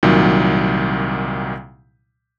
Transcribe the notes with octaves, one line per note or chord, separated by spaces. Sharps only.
C2 A#2 D#3 F#3